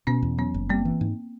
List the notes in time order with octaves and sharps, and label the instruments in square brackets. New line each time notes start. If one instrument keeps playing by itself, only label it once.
[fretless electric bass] B2 [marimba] B3 C#4
[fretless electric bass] E2
[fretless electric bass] F#3 [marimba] B3 C#4
[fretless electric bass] F#1
[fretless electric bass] G3 [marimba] A#3 C4
[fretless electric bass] E3
G#2